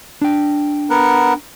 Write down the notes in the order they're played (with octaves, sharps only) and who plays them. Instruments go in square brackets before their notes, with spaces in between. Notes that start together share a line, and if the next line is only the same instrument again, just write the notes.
[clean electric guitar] D4 G5
[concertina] B3 A#4 F#5